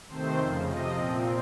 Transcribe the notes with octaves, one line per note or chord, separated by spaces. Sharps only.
C3 D#3 A3 C4 C5
F2 C#3 F3
C3 F3 C4 D#5
A#2 F3 C4